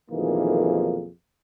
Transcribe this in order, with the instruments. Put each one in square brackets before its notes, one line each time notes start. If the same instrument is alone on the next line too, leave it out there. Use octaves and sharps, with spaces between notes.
[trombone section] B1 F2 D#3 E3 A#3 G#4